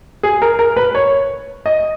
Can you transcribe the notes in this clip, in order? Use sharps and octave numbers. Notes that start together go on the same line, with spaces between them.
G#4
A#4
A#4
B4
C#5
D#5